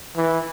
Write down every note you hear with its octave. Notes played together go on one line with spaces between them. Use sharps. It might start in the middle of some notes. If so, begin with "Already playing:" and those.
E3